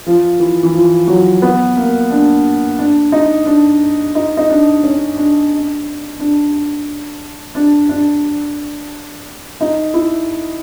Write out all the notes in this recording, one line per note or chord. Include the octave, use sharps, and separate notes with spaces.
F3
E3
E3
F3
F#3
B3
A#3
D4
D4
D#4
D4
D#4
D#4
D4
C#4
D4
D4
D4
D4
D#4
E4